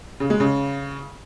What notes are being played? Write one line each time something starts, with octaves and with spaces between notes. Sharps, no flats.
C#3
G#3
C#3